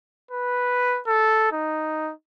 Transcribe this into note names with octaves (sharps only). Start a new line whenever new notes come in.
B4
A4
D#4